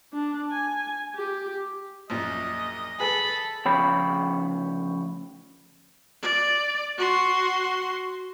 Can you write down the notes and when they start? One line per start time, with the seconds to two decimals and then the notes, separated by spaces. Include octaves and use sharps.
0.13 D4
0.51 G#5
1.15 G4
2.10 A#1 F#2 A#2 D#5
3.00 G#4 A4 B4 G#5 B5
3.65 D2 C#3 F3 C#5 G5 B5
6.22 D5
6.97 F#4 C6